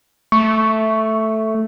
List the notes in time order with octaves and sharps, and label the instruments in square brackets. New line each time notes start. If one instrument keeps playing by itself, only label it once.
[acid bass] A3 [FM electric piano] C#6